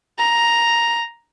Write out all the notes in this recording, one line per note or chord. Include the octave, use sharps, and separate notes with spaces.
A#5